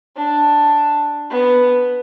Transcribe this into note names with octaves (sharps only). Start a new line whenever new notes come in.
D4
B3